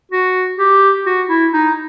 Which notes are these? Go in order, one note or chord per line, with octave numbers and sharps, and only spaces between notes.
F#4
G4
F#4
E4
D#4